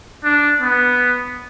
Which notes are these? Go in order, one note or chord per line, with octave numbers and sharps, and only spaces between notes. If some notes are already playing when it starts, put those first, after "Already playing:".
D4
B3